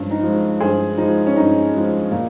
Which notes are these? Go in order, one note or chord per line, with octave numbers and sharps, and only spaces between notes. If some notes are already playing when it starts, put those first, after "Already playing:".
Already playing: G2 F3 G#3 C#4
D#4
F3 G#3
G2 G#4 C5
F3 G#3 D#4
C#4
G2 D#4
F3 G#3
A#2